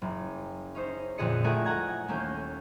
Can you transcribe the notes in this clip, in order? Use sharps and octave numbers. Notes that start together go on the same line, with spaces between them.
F#1
C#4 D#4 C5
F2 A#2 D3 G#4 D#5 C#7
A3 D#4 E4 A#4 F#5 G#5
F#5 A#5 G#6
D#2 A3 A#3 C#4 G6